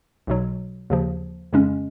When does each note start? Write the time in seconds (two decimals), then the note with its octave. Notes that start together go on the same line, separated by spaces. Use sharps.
0.27 B1 B2 F#3
0.90 D#2 C#3 F3
1.53 F2 C#3 G#3 C#4